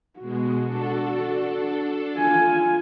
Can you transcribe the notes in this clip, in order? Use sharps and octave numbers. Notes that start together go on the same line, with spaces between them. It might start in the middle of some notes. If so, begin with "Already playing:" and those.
B2 G#3 F#4
D4 A4
F4 G#5